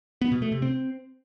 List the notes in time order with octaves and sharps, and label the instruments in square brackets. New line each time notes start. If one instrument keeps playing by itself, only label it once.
[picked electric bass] B3
B2
A3
C3
C4